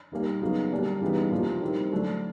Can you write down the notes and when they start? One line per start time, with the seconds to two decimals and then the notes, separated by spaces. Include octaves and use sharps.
0.12 D#3 G3 A#3
0.41 C#3 F#3 B3 D#4
0.71 D3 G3 A#3 D4
1.01 C#3 E3 G3 B3 D#4
1.31 C3 F3 A#3 D4
1.61 D#3 G3 C4 E4
1.92 D3 F#3 A3 D4